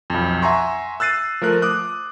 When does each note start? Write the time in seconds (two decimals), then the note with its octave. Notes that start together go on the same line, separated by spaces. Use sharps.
0.10 B1 F2
0.42 E5 F#5 G#5 A#5 C6 C#6
1.00 E6 F#6 A6 C7 D#7
1.41 F3 A3 A#4 F#6
1.62 D6 D#6 F#6